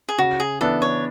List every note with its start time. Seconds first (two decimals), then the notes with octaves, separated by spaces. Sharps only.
0.09 G#4
0.18 C#3 F#4
0.40 G#4
0.61 E3 B3 D4 A4
0.82 C#5